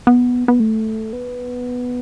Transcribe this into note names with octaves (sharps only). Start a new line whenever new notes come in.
B3
B3
A3
B3